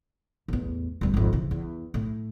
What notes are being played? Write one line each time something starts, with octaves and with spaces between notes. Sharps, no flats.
A1 E2
D1 G2
G#1 F2
C#3 E3
E2
A2